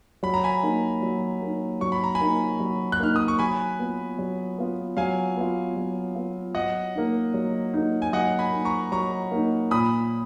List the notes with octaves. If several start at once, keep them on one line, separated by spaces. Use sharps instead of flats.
F#3 B5
A#5
G#5 B5
A#3 D#4
F#3
A#3 D#4
F#3 C#6
B5
A#5
G#5 B5
A#3 D#4
F#3
F#6
A#3 D#4 F6
D#6
C#6
F#3 G#5 B5
B3 F4
F#3
B3 F4
F#3 F5 G#5
B3 F4
F#3
B3 F4
F#3 D#5 F#5
A#3 D#4
F#3
A#3 D#4
G#5
F#3 D#5 F#5
G#5 B5
A#3 D#4
A#5 C#6
F#3 A#5 C#6
A#3 D#4
A#2 B5 D#6